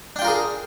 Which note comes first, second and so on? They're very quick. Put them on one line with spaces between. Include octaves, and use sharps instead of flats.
D4 G5 F4 A#4 G#4